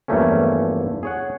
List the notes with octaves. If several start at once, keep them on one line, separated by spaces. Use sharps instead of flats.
E2 G2 F3 A3 A#3 C#4
G#4 C#5 F#5